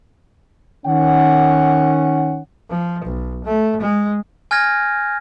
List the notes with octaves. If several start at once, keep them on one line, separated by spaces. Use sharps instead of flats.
D#3 C#4 F#5
F3
B1
A3
G#3
G#5 F6 G6 G#6 A#6